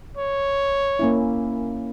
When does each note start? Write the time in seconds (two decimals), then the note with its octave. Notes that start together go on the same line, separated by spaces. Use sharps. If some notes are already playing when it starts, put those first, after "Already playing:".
0.17 C#5
0.99 A#3 C#4 E4